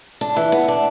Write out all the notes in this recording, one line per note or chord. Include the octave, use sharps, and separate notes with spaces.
D4
E3
B3
D4